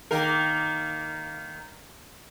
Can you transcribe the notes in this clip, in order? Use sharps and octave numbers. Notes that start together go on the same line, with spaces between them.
D#3 A#3 A#4